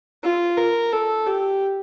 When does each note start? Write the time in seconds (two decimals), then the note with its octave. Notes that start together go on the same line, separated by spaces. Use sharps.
0.23 F4
0.57 A#4
0.93 A4
1.27 G4